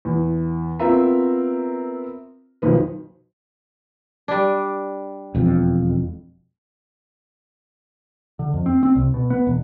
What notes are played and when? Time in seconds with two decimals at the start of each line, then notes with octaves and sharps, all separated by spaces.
0.05 E2
0.80 B3 C4 F4 A#4 E5 A#5
2.62 B1 F2 D#3 B4
4.28 G3 D4
5.35 E1 F2
8.39 D3
8.54 F2
8.66 C4
8.83 C4
8.95 C2
9.14 B2
9.30 B3
9.47 E1